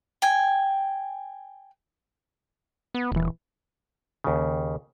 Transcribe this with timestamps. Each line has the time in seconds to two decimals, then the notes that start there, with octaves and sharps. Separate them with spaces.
0.22 G5 G#5
2.94 B3
3.12 D#1 A#1 E3
4.24 D#2 C#3